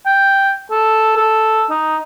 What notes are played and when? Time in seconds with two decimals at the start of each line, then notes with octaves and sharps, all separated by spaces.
0.06 G5
0.71 A4
1.17 A4
1.70 D#4